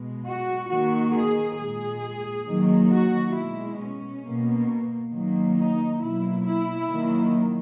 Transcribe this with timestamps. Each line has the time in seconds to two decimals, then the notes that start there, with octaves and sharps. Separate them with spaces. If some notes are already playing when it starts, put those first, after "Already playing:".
Already playing: B2 G#3
0.27 F#4
0.70 D#3 A#3 F#4
1.15 G#4
1.59 A#2 G#3 G#4
2.47 D#3 F#3 A#3
2.91 F#4
3.35 B2 G#3 E4
3.80 C#4
4.24 B2 A#3
5.12 D#3 F#3 A#3
5.56 D#4
6.00 B2 F#3 A#3 E4
6.44 E4
6.89 D#3 F#3 A#3